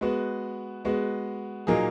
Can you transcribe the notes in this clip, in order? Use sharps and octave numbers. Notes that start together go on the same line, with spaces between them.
G#3 B3 F#4
G#3 B3 F#4
A#2 F#3 A#3 D#4 G#4